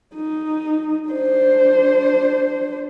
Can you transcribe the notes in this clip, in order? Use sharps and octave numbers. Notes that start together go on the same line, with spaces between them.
D#4
D4 C5